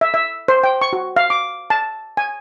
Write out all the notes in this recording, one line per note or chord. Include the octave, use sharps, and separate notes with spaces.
E5
E5
C5
G5
C#6
F#4
F5
D6
A5
G#5